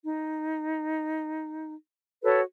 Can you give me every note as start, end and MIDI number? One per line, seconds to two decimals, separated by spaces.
0.03 1.74 63
2.23 2.41 66
2.23 2.41 69
2.23 2.41 71
2.23 2.41 73